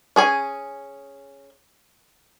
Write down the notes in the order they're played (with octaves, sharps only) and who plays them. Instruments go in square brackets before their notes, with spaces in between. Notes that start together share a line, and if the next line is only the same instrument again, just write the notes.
[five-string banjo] C#4 G#4 G#5